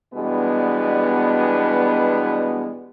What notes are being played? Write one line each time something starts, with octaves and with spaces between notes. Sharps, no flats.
B2 E3 G3 G#3 B3 D4